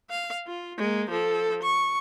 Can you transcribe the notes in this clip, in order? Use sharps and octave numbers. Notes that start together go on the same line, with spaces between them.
F5
F4
G#3 A#3
F3 A4
C#6